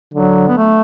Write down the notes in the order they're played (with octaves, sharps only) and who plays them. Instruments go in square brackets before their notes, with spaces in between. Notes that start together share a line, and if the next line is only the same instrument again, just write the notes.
[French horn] D3 [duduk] F#3
[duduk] B3
A3